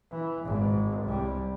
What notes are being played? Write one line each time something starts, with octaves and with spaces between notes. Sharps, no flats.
E3
G#1 G#2
C2 G3